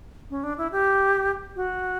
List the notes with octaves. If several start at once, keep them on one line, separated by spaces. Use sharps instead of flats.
C#4
D4
E4
G4
F#4